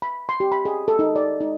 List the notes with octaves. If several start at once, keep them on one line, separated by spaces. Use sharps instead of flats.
B5
C6
G4
B5
G#4
A4
D#4
D5
D#4